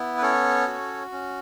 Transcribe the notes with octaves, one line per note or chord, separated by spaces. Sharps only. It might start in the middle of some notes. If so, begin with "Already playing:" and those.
Already playing: B3 E4
B4
C#4 A4 C#5
F#4
C#4